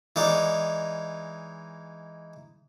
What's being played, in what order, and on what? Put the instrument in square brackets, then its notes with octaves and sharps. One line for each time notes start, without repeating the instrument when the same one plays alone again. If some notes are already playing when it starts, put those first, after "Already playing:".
[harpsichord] E3 G#3 D#4 C#5 D5